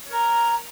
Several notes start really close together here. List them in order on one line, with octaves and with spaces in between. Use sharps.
C#5 A#4 A#5